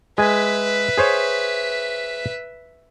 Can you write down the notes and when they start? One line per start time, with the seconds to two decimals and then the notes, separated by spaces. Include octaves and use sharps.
0.18 G#3 B4 E5 G#5
0.97 G#4 C5 C#5